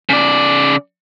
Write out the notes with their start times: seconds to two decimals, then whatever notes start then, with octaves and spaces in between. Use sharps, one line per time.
0.09 C#3 D5